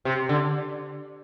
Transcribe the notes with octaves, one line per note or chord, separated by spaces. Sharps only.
C3
D3